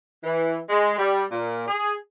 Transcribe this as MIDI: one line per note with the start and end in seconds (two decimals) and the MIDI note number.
0.24 0.58 52
0.70 0.98 56
0.98 1.24 55
1.32 1.66 46
1.68 1.95 68